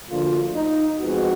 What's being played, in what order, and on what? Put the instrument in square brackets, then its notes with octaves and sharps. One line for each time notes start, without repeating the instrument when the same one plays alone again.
[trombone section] D2 D3 F3 A#3 F4
D#4
F2 F3 G#3 B3 F#4